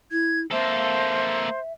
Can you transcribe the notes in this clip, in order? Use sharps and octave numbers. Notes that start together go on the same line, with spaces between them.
E4 G#6
A#3 A4 C5 E5